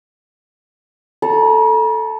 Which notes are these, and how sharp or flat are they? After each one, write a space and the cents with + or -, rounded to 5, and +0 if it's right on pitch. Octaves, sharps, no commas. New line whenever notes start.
A4 +0 A#5 +45